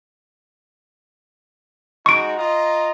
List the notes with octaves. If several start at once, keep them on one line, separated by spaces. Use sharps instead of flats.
G#3 D#4 F#4 C#6 D7
F4 D#5 A#5